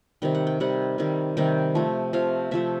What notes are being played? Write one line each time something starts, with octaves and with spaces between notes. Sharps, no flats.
C3 D#3 G3 G5
F#5
G5
C3 D#3 G3 F#5
C3 D#3 G3
C3 D#3 G3 G5
C3 F3 A3
C3 F3 A3 F5
C3 F3 A3 E5